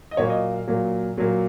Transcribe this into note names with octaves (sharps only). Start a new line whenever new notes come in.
D#5
A#2 F#3 A#3 C#5
D#5
F5
A#2 F#3 A#3
A#2 F#3 A#3